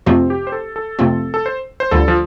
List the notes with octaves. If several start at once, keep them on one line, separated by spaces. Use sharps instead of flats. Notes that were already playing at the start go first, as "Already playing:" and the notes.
F2 C3 F3 A3 C4 F4
G4
C5
A4
A4
F2 C3 A3 C4 F4
A4
C5
C5
D2 D3 G3 F4 A4
F3